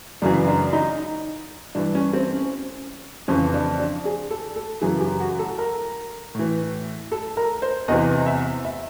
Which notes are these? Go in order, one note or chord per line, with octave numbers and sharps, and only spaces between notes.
F#2 C#3 E3 D4
D4
D#4
G2 E3 D4
C#4
C4
C#4
F2 C#3 E3 C#4
D4
D4
G#4
A4
A4
F#2 C#3 E3 G#4
G4
F#4
A4
A#4
A2 E3
A4
A#4
C5
E2 C3 E3 D#5
E5
E5